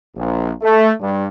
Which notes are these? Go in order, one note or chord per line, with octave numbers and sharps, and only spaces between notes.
A#1
A3
G2